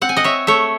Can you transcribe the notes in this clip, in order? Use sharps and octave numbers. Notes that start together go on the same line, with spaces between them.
C4 F#5
G#5
D#5 F#5
C#5 E5
A3 C#5 E5